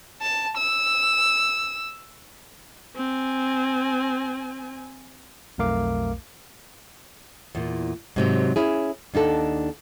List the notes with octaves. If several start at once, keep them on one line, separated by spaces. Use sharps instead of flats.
A5
E6
C4 G#5
B1 F2 A3 A#4 F5 D6
E2 A#2
G#2 C3 F#3
C#4 E4 G#4
D#2 D4 D#4 A4 F#5